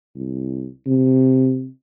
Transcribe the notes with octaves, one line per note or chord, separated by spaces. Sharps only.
C2
C3